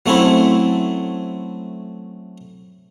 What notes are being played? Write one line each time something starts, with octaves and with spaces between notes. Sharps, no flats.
F#3 A3 C4 C#4 E4